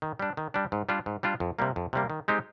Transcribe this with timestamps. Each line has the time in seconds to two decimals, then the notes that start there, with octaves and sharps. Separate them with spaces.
0.02 D#3
0.19 G3 D4
0.37 D#3
0.54 G3 D4
0.72 G#2
0.89 G3 D4 F4
1.06 G#2
1.23 G3 D4 F4
1.40 F2
1.59 C3 G3 A#3
1.76 F2
1.93 C3 G3 A#3
2.10 D#3
2.28 G#3 C4 D#4 G4